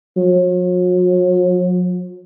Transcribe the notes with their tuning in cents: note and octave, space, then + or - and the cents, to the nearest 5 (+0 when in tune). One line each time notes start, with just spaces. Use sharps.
F#3 -45